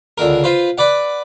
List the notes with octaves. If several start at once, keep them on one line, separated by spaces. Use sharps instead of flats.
C#2 D3 A#4
F4 B4 C5
B4 D5 F#5